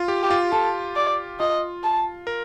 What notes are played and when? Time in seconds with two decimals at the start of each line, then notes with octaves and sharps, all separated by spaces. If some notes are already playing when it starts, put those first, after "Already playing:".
Already playing: F4
0.08 G4
0.23 G4
0.30 F4
0.52 F4 A4
0.96 D5
1.40 F4 D#5
1.84 A5
2.27 A#4